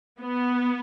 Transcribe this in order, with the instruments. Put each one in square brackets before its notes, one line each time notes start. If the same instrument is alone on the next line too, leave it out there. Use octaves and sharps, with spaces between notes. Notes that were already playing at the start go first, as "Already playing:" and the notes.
[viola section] B3